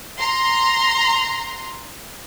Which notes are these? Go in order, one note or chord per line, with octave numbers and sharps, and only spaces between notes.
A#5 C6